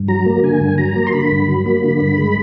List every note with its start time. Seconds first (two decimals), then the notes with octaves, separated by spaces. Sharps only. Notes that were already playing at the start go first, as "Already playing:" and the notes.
Already playing: G2
0.08 F#3 A#5
0.26 A#3
0.43 D3 G#5
0.60 G2
0.78 F#3 A#5
0.96 A#3
1.07 C6
1.13 D3 B5
1.31 G2
1.48 F#3
1.66 A#3
1.84 D3
2.01 G2
2.18 G#3